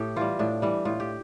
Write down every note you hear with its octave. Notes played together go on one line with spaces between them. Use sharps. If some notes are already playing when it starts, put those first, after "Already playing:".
Already playing: A2 G4 A4
E3 G3 F4
A2 D4
E3 G3
A2 F4
G4